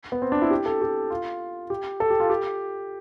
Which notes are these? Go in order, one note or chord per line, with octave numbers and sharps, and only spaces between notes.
B3
C4
D4
E4
G4
A4
G4
F4
G4
A4
G4
F4
G4